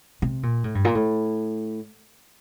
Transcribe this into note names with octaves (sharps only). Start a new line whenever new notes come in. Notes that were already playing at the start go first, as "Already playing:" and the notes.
C3
A#2
A2
G2
A#2
A2